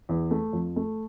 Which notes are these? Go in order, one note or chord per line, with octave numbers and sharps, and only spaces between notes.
E2
A3
F2
A3